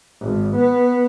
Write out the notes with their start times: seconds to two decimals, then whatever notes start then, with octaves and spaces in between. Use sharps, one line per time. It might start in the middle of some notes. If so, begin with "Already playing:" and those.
0.21 G#1
0.54 B3